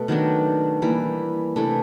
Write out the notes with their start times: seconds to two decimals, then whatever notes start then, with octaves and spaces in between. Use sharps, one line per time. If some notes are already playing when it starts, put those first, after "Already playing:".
Already playing: B2 A3
0.08 D#3 F#3 B3 D4
0.82 E3 G3 A#3
1.56 C3 E3 A3 D4